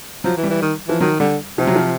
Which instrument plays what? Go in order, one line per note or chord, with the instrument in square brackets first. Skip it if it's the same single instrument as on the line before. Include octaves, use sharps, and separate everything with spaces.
[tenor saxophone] F3 [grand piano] F#3
[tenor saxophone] E3
[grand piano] G3
[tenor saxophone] E3
D#3
[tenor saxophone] E3 [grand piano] F3
[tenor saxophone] D#3 [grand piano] F#3
[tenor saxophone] D3 [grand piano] G3
[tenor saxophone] C3 [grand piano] F3
[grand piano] F#3
F3